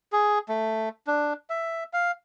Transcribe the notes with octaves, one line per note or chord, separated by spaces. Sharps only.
G#4
A3
D4
E5
F5